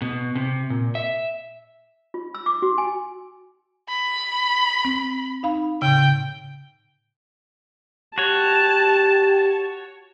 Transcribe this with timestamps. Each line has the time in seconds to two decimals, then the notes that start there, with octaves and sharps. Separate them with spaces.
0.02 B2
0.35 C3
0.70 A#2
0.95 E5
2.14 F4
2.34 E6
2.46 D6
2.62 F#4
2.78 G#5
3.88 B5
4.85 C4
5.43 D#4 F5 B5
5.82 A2 C#3 G5
8.18 F#4 G4 C#5 A5